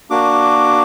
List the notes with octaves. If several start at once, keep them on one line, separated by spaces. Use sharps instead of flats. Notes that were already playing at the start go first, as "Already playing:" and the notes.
A#3 D4 F#4 D6